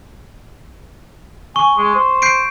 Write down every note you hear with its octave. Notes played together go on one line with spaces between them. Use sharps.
G#5 C#6
G#3
C5
G6 C7 D7